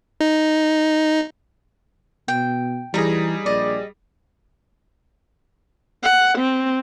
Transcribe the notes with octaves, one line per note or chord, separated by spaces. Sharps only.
D#4
B2 G5
E3 G3 D#4 G#4 A#5
A#1 D5 D#5
F#5
C4